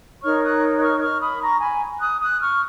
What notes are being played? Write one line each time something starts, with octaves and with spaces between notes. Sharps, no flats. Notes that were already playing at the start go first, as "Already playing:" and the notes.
D#4 A#4 C#5 C#6 F6
D#6 F#6
F#6
C#6 F6
F#6
C#6 F6
B5 D#6
A#5 C#6
G#5 B5
D#6 F#6
D#6 F#6
C#6 F6